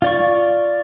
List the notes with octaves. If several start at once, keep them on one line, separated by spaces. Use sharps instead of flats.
F4 D5 C#6